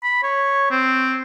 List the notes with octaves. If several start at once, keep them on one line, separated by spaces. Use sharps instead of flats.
B5
C#5
C4